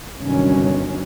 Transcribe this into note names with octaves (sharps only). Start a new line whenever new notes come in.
G1 G2 C3 D#3 F#3 C#4